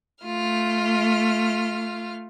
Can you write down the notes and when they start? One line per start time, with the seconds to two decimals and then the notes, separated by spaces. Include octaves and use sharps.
0.24 A3 F4 F6